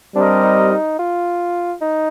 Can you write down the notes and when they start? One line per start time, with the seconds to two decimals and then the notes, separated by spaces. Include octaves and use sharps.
0.16 G3 C4 D4 G4 A#4 D#5
0.44 D#4
0.71 D#4
0.99 F4
1.81 D#4